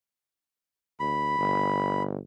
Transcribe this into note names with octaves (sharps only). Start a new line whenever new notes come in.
D2 B5
G1